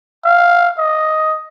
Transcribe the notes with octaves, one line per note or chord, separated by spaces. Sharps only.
F5
D#5